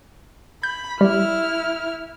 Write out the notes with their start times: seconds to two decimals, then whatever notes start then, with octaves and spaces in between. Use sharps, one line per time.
0.63 B5 G6
1.01 G3 E4 F6